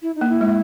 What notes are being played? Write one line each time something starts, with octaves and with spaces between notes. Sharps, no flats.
E4
D#4
A#3
E4
G#3